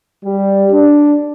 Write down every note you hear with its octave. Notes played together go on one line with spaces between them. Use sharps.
G3
D4